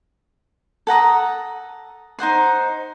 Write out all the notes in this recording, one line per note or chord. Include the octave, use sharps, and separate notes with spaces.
A4 F#5 A#5 D#6
D#4 C5 F#5 C6